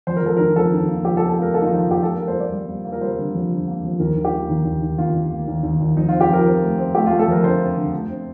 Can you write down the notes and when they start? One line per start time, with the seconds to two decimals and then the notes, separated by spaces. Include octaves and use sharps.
0.07 F2 C5
0.17 A#4
0.23 F2 A4
0.37 D#3 A#4
0.56 F2 A4
0.73 D#3
0.88 A#3
1.05 F2 G4
1.17 A4
1.22 F2
1.29 A4
1.38 A#3 A#4
1.54 A#3 A4
1.62 D#4
1.66 F4
1.71 F2
1.79 F4
1.87 F2 G4
2.03 A#3 A4
2.16 A#3 A#4
2.28 C5
2.36 G3 D5
2.52 G3
2.69 A#3
2.85 A#3
2.92 A#4
3.01 G3 C5
3.18 D3
3.34 F2
3.51 D3
3.68 A#3
3.84 F2
4.00 D#2 A#4
4.16 D#3
4.25 G4
4.33 A#3
4.50 D#2
4.65 D#2
4.82 D#2
4.98 D#2 F4
5.15 D#2
5.30 A#3
5.47 D#2
5.63 D#2
5.80 D#2
5.96 F2 D#4
6.08 C4 F4
6.21 G4
6.29 F2 A#4
6.46 C4
6.62 A3
6.78 C4
6.95 A3 G4
7.07 A3 F4
7.19 A4
7.28 F2 A#4
7.44 D3 C5
7.60 C4
7.77 D3
7.93 A3
8.09 C4